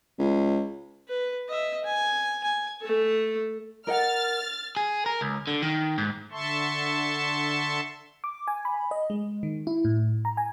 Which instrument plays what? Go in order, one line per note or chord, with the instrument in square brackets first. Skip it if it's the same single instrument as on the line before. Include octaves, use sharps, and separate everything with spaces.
[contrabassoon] C#2
[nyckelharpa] B4
D#5 E5
G#5
G#5
A3 A4
[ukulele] A#4 D#5 F#5 [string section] F6 A6
[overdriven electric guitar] G#4
A#4
C#2
D3
D#3
G#2
[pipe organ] D3 E5 A5 C6 C#6
[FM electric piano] D6
G#5
B5
D#5
G#3
D#3
E4
A2
A#5
G#5